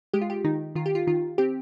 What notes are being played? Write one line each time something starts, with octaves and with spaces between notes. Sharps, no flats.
G#3 G4
F4
G4
D#3 D#4
D#3 F4
G4
F4
D#3 F4
C4 G4